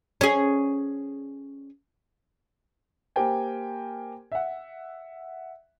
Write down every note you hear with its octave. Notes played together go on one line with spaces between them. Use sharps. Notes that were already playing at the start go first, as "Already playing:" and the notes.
C#4 G#4
A#3 G4 A#4 C5 G5 G#5
E5 F#5